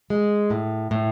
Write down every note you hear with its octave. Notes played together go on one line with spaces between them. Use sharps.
G#3
A2
A2